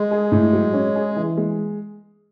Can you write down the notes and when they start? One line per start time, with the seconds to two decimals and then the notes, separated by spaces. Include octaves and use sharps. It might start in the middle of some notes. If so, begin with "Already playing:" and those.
Already playing: G#3
0.11 G#4
0.32 A2
0.53 F#3
0.73 C#4
0.95 G#4
1.16 E3
1.37 G#3